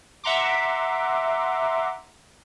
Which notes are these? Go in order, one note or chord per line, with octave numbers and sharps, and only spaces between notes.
E5 F#5 A#5 C6 D6